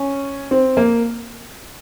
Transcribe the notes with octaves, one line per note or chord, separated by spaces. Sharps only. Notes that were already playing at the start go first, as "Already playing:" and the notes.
Already playing: C#4
C4
A#3